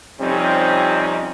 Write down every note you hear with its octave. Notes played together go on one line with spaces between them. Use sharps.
F2 C3 G3 C4 C#4 D#4